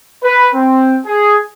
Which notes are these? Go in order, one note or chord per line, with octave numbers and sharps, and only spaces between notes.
B4
C4
G#4